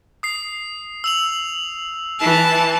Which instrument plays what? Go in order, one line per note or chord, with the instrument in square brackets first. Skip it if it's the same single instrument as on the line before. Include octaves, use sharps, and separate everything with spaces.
[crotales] D#6 C7
E6 F7 F#7
[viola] E3 A5